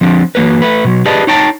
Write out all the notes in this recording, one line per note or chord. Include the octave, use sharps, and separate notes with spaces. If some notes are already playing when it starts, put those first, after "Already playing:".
F3 C4 D4
E3 F#3 A#3 A#4 B4
A3 B4
B2 F#3
G4 G#4 B4 D5 D#5 A5
D#4 C#5 G5 A5 A#5